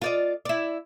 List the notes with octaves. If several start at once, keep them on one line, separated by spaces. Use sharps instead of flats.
F4 D5 D#5
E4 D5